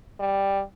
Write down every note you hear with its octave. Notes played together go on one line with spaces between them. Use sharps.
G3